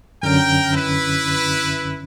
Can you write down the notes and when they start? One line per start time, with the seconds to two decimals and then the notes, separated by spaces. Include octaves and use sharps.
0.23 F#2 D3 C#4 A#4 G5
0.73 E4 B4